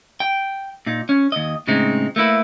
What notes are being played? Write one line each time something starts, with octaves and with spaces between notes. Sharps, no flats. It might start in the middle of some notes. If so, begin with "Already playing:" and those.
G5
A#2 D#4
C#4
D#2 D#5
A2 C#3 G#3 C4 D#4
A3 A#3 E4 B4